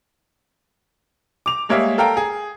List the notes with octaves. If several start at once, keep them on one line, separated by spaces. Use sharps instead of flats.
D6 F7
G3 G#3 A#3 C#5 E5 F5
A4 A#4 F5 G5 A#5
G#4